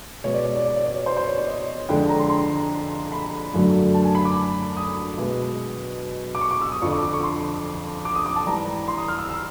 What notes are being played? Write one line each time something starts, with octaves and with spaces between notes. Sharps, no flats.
B2 G#3 C#5
D5
C#5
D5
D5
D5
D5
C#5
C5
C5
C#5
D5
D#5
F2 D3 F3 G#3 G5
A#5
C6
C6
B5
F#2 D3 F#3 A3
A5
G#5
B5
D6
D#6
B2 G#3
D6
C#6
D6
E6
D#6
F2 D3 F3 C#6
D6
D6
C#6
C6
D6
D#6
D6
A5
G#2 E3 G3 A#5
C6
D#6
F6
E6
E6